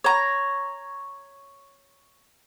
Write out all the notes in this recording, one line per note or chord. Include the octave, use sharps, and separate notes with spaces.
C#5 A#5